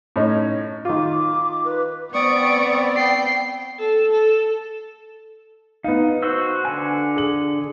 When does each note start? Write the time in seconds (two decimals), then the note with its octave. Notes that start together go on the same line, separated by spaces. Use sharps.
0.16 A2 C#4 D#4
0.85 D#3 F4 D6
1.65 B4
2.14 B3 C4 D5 C#6 D#6 D7
2.96 G5 C7
3.79 A4
4.12 A4
5.84 B3 D#4 F5
6.22 F#4 C5 E6
6.65 D3 G#5
7.16 G#4 F#7